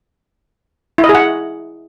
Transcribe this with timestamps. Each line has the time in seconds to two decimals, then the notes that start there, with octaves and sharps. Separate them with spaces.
0.98 E4
1.04 D#5
1.09 G#4
1.15 F#5